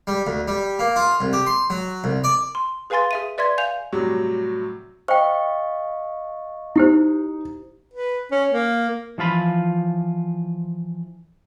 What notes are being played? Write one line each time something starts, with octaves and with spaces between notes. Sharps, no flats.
G3
D2
G3
A#3
F4
C2
G4
C6
F#3
C2
D5
C6
G#4 B4 F5 G#5 C6 A6
G#4 E5 D#7
B4 D5 E5 C6 G#6
F5 G#5 G6 F7
A2 C3 F#3 G3
C5 D#5 F5 G5 C#6
D#4 E4 G4 C5
B4
C#4
A#3
E3 F3 F4 B5